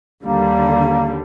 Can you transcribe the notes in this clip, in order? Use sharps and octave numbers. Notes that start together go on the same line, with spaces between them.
D#2 D3 G3 A#3